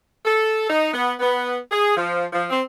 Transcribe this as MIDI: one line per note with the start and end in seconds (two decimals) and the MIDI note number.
0.26 0.68 69
0.69 0.93 63
0.93 1.12 59
1.20 1.57 59
1.71 1.94 68
1.97 2.26 53
2.33 2.44 53
2.50 2.61 60